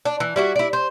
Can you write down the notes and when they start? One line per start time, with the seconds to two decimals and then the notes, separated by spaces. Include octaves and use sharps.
0.05 D4
0.20 E3
0.36 G3 E4 F#4
0.56 E4 D5
0.73 C5